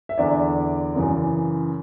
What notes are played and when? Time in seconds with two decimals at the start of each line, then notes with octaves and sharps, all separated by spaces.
0.09 E5
0.18 E2 D3 D5
0.95 F#2 C#3 E3